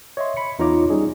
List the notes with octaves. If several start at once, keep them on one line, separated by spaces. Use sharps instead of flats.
C#5 D#5 E5 C6
B5 C#7
E2 D#4 F4 C#5 A#5 D6
G3 C#4 D#4 G#4